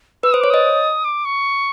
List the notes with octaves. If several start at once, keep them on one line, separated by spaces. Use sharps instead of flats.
B4 E6
C5 D#6
C#5 D6
D#5 D#6
D6
C#6